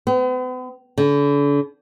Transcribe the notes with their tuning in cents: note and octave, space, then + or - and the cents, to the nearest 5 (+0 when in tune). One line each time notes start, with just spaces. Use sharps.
B3 +45
D3 -40